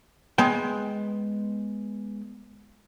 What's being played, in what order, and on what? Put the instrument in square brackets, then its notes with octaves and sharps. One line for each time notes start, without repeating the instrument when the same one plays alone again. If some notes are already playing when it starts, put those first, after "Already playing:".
[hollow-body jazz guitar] G#3 B3 G5